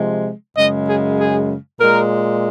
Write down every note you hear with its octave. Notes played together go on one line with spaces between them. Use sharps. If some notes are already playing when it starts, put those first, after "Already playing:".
Already playing: C3 F3 G#3
F#2 C#3 G#3 D#5
G#4
G#4
A#2 G#3 A#4